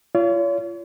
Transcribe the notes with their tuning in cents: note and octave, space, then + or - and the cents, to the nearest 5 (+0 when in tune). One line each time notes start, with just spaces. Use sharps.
F4 -30 C#5 +40